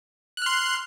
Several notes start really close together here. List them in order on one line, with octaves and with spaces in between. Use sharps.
F#6 F6 C6